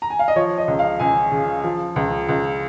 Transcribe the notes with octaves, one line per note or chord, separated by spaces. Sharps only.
A#5
G#5
F5
D#5
F3 C#5
D#5
C#2
F5
C#2 G#5
C#3
F3
C#2
C#2